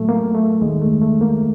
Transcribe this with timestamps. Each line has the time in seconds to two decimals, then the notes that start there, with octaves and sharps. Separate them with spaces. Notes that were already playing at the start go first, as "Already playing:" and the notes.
Already playing: A2 F#3 A3
0.09 A#3
0.35 A3
0.61 D#2 D#3 G#3
0.81 A3
1.01 A3
1.21 A#3